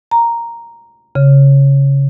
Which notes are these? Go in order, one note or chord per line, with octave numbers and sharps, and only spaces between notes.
A#5
C#3